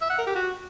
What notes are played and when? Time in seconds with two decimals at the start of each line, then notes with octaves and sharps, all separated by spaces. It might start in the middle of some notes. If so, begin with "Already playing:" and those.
0.02 E5
0.10 F#5
0.19 A#4
0.27 G4
0.35 F#4